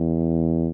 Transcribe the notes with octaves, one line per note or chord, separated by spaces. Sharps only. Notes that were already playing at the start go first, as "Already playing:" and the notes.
Already playing: E2